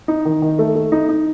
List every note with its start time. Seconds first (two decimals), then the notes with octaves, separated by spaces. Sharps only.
0.08 D#4
0.25 D#3
0.42 D#3
0.59 A3
0.75 A3
0.92 D#4
1.09 D#4